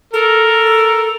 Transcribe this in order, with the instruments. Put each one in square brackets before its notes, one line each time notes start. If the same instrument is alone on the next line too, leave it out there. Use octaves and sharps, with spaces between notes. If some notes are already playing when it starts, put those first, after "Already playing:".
[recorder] A4 [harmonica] A#4